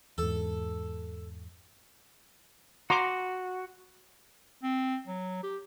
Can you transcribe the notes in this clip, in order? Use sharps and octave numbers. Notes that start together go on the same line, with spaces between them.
E2 G#2 A4
F#4 A#5 C6 D6
C4
F#3
G4